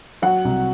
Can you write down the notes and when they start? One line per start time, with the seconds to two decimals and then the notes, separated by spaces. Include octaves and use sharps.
0.22 F#3 F#5
0.45 C2